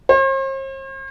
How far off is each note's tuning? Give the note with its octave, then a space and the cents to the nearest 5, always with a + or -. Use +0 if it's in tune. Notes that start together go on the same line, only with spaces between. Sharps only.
C5 +45